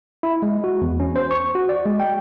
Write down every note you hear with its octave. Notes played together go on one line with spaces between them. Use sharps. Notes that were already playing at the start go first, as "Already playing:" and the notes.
E4
G#3
F#4
E2
C#4
C5
C#6
F#4
D5
G#3
G5